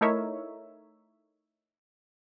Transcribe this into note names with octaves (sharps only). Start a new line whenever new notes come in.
A3 D#4 E4 A#4 C#5 E5